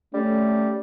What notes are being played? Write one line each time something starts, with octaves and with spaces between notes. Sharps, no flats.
G3 A3 C#4